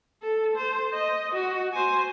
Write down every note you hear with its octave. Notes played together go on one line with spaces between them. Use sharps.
A4
C5
D#5
F#4
C5 G#5